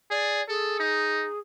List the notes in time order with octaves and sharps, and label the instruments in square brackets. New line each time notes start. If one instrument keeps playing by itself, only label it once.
[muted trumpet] G#4 [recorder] D5
[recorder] G#4 [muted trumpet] A4
[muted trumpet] D#4